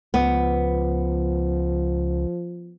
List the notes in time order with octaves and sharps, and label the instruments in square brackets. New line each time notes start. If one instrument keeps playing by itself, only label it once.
[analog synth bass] C#2 [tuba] F3 [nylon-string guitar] B3